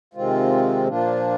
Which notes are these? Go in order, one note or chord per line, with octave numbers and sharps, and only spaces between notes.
C3 D#3 G#3 C4 F4
A#2 F3 A#3 D4 F4